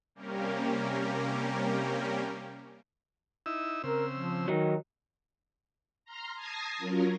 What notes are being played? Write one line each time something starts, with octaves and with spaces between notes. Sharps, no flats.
C3 G3 A#3 C#4 G4 A#4
D#4 E4 E6
C#3 C4 A#4 E6
F3
D#3 F#3 D#4
A#5 C6 F6
A5 D#6 G#6 A#6 C7
F#3 C#4 F4 A#4